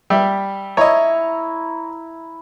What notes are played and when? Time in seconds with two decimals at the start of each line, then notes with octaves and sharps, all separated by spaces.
0.10 G3 G4 E5
0.77 E4 C#5 D#5 A#5